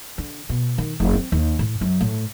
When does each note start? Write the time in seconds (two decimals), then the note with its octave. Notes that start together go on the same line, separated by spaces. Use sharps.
0.18 D3
0.49 B2
0.78 D#3
1.00 F#1
1.14 C4
1.32 D#2
1.59 A2
1.81 F#2
2.01 A2